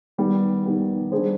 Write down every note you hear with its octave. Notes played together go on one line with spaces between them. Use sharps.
D#3 G3 B3
D#3 G3 B3
G3 D4 G#4 C5